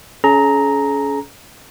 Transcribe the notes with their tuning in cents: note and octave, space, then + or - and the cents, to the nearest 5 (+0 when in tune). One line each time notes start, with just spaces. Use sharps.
C#4 +20 G#4 +40 A#5 +0